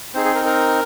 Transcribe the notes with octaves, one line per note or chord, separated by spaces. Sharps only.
C4 D#4 G#4 C5
G#4
A#4
A#4